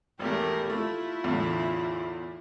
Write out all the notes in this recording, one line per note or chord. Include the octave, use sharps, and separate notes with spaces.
G#1 E2 A3 G4 A#4
A3 E4 F4
E2 A2 D3